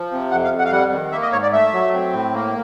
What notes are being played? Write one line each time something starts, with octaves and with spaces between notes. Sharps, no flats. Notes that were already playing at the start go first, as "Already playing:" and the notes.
Already playing: F3
C3
F2 F#5
F5
F2
F#5
F5
G3 F#5
D#3
A#3 E5
D#5
G#2 C#5
D5
A3 E5
F#3
C4
A2
A#3